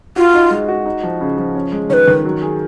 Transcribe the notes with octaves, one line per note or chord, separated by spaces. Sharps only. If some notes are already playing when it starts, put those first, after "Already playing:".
F4 F#4
D#4
G#3
F#4
D#4
F3
C#3
F3
C#4
G#3
D#3 B4 C#5
D#3
F#3
G#4